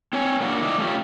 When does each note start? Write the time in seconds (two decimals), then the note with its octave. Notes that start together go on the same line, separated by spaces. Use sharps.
0.13 C4 C#5 G#5
0.41 A#3 C#4 D4 F4 F#4
0.62 D#3 E4 D5 D#5
0.78 A3 C#4 F4 G4